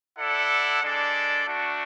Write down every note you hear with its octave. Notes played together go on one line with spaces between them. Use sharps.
E4 A4 D5 F#5
G#3 D4 A4 D5
A3 D4 F#4